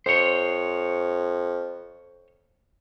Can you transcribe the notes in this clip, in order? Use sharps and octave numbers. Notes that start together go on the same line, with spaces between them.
F2 C5 C#5